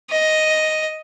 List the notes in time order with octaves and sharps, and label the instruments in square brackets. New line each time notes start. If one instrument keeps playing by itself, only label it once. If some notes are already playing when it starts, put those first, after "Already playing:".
[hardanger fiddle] D#5